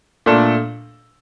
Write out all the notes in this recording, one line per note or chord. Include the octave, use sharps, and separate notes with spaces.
A#2 A3 D4 A4